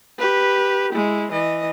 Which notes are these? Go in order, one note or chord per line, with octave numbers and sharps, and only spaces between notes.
G4 B4
G#3 E4
E3 D#5